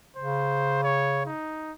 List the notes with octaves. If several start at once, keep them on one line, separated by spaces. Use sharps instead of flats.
C#3 C5
C#5
D#4